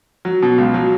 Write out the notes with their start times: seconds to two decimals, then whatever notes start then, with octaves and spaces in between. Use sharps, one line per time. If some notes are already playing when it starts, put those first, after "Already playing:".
0.25 F#3
0.42 B2
0.58 C#2
0.74 F#3